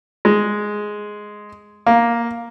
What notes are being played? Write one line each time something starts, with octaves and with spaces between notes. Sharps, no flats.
G#3
A#3